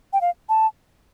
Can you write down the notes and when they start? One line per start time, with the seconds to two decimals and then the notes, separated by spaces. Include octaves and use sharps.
0.13 G5
0.21 F5
0.49 A5